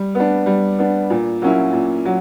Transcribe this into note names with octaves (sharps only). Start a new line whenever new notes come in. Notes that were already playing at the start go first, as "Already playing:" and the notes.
Already playing: G3
B3
D4
G3
B3 D4
A#2
F#3 A#3 C#4 E4
A#2
F#3